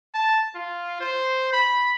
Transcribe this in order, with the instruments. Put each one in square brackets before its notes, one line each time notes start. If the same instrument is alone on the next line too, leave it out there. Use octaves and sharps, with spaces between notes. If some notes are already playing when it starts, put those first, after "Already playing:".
[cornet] A5
F4
C5
B5